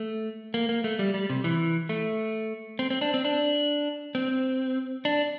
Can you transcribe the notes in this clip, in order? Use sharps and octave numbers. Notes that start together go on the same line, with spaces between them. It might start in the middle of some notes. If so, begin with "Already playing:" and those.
Already playing: A3
A#3
A#3
A3
G3
G3
C3
E3
A3
C4
C4
D4
C4
D4
C4
D4